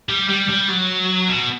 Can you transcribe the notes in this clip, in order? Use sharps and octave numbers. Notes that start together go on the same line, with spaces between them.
G3
G3
G3
F#3
B2